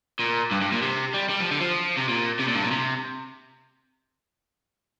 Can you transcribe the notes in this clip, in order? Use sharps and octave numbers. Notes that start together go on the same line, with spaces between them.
A#2
G2
G2
A#2
C3
G3
G3
F3
D3
F3
C3
A#2
C3
A#2
G2
A#2
C3